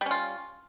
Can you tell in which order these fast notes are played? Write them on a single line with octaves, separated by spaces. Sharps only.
G3 C#4 F4